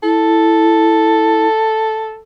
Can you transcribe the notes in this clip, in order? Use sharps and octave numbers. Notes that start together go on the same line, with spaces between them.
E4 A4